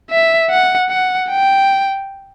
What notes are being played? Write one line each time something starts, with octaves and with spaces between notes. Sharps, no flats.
E5
F#5
F#5
G5